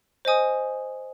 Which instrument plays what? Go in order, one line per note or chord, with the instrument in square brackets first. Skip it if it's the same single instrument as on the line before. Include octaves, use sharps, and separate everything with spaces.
[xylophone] C5 D#5 G#5 D#6